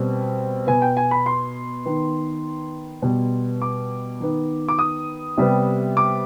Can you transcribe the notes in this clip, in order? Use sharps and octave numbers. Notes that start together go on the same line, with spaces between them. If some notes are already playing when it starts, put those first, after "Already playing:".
Already playing: B2 G3 C4
B2 B3 G#5
G5
G#5
B5
C6
D#3 B3
B2 G3 B3
D6
D#3 B3
D6
D#6
C3 G3 B3
D6